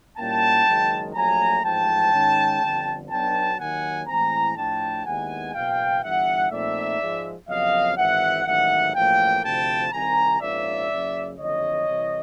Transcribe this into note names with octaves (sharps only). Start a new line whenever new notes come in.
A#2 G3 A#3 C#4 E4 G5 A5
F#1 F#2 D#3 G#3
A#1 A#2 F#3 A3 G#5 A#5
A1 G#2 F3 G5 A5
G#2 D#3 G#3 C#4
G1 F2 D3
B1 B2 F#3 B3 D4 G5 A5
D#2 D#3 F#3 F#5 G#5
A2 E3 G#3 C4 G#5 A#5
A2 F3 A3 D4 G5 A5
D#2 D#3 G#3 B3 E4 F#5 G#5
F#1 E2 B2 F5 G5
G1 G2 E3 E5 F#5
A#2 F3 A3 C4 D#4 D5 E5
G#2 F3 G#3
F2 C#3 F#3 B3 D#5 F5
G#1 G#2 E3 E5 F#5
A1 G#2 D#3 F#3 E5 F#5
A1 A2 F3 A#3 F5 G5
D2 C3 F3 G5 A5
C2 C3 D#3 G#5 A#5
A#1 G#2 F3 A#3 C#4 D5 E5
F#1 F#2 C#3
F#1 F2 D3 C#5 D#5
C2 C3 E3